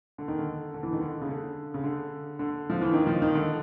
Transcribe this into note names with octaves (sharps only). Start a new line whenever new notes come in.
D3
D#3
D3
D3
E3
D#3
D3
C#3
D3
C#3
D3
D3
F3
E3
D#3
F3
D#3
D3